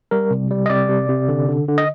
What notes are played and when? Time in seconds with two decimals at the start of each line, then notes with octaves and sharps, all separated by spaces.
0.11 G3 A#4
0.31 C3
0.51 G3
0.66 D#5
0.70 C3 D5
0.89 C3
1.09 C3
1.29 D3
1.49 D3
1.68 D3
1.78 D#5